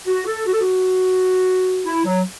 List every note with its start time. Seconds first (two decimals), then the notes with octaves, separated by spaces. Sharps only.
0.07 F#4
0.26 A4
0.46 F#4
0.53 A4
0.60 F#4
1.86 E4
2.05 F#3